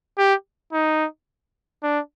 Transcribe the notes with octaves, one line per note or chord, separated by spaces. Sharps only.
G4
D#4
D4